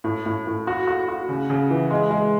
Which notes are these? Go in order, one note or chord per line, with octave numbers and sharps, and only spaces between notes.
A2
A2
A2
F#4
F#4
F#4
C#3
C#3
E3
G#3
G#3